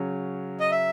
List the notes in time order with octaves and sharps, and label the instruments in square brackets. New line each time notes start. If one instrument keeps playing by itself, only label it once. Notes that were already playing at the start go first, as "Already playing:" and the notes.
Already playing: [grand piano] C#3 F#3 C#4
[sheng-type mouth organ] D#5
E5